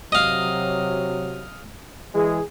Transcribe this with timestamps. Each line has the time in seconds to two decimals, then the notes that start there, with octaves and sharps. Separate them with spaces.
0.12 C3 F#3 D#5 F5
2.15 E3 G#3 G#4